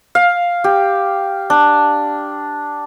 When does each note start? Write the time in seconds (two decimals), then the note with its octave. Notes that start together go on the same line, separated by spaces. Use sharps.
0.15 F5
0.64 G4
1.50 D4